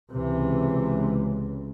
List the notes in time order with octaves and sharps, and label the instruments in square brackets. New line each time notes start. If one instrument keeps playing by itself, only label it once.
[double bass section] C#2 [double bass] C3 E3